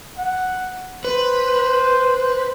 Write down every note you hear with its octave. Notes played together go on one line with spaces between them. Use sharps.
F#5
B4 C5